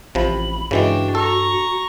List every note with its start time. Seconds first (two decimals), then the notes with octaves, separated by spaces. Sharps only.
0.15 A1 C3 F3 B5
0.71 G2 C#3 E3 G#3 D4 F#4 G5
1.15 A4 A#5 C#6